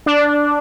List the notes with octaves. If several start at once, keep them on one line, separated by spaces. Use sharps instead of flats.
D4